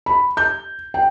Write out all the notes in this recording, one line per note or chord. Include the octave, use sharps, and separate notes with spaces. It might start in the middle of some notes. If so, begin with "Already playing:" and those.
B5
G6
G5